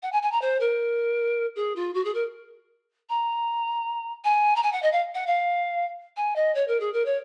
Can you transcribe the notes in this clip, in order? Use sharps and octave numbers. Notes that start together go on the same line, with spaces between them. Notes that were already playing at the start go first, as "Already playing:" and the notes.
F#5
G#5
G#5
A#5
C5
A#4
G#4
F4
F#4
G#4
A#4
A#5
G#5
A#5
G#5
F#5
D#5
F5
F#5
F5
G#5
D#5
C#5
A#4
G#4
A#4
C#5